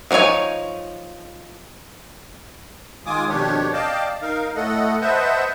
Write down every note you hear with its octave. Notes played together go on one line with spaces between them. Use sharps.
F3 C#4 D#4 C#5 G#5
D#3 G#3 F4 G#5 D6 D#6
F2 B2 D#3 D4 G4 C#5
D5 D#5 F5 G5 A5 D6
D#4 A#4 F5
A2 A3 A4 D#5 F#5
B4 C5 D#5 E5 F#5 A5